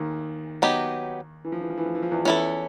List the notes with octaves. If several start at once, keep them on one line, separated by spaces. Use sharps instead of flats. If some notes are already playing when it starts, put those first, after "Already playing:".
Already playing: D#2 D#3
F#3 B3 D#4 G4
E3
F3
E3
F3
E3
F3
E3
F3
E2 E3
E2 E3 C#4 E4 A4